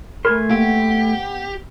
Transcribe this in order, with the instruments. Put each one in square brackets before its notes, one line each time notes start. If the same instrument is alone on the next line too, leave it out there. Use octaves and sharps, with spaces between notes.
[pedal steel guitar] A3 G#5 C6 [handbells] A#4 B5
[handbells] A#3 [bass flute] B3 [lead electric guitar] G4